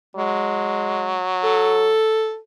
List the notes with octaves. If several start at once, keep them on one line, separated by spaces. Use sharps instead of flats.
F#3 G#3
A4